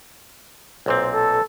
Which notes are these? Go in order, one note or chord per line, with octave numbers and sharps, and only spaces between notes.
B1 A#2 C4 C5
A4